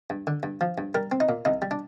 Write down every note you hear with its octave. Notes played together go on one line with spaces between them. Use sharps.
G2
D3
G2
F3
G2
G3 A#4
C4
D#4
A#2
C2 D#4
G3
D4